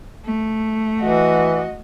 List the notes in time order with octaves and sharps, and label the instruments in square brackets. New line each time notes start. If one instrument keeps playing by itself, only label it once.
[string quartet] A3
[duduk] E3 [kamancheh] F#4 D#5